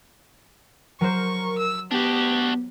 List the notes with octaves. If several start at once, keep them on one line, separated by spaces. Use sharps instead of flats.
F#3 A#4 C5 C#6
E6
B3 D4 F#4 G4